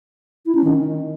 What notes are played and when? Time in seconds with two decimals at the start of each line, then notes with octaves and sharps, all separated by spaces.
0.46 E4
0.55 C#4
0.64 D#3